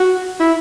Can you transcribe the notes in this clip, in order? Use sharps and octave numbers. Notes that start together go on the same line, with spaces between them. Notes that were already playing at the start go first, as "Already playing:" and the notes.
Already playing: F#4
E4